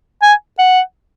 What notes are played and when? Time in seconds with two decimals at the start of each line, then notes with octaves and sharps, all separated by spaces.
0.23 G#5
0.59 F#5